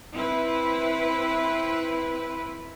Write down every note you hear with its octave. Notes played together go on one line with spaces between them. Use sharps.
C4 E4 B4